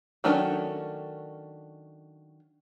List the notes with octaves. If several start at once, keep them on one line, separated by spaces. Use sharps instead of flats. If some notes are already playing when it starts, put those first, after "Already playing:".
D#3 F#3 A3 C#4 D4